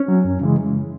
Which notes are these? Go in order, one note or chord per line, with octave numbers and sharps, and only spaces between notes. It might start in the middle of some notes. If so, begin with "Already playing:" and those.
Already playing: C#4
F#3
F#2
C#3 E3 G#3